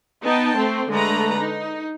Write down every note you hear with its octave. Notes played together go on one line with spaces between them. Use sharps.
B3 D#4 G5 A5
A3 C4
D3 G#3 A3 B4 A#5
D#4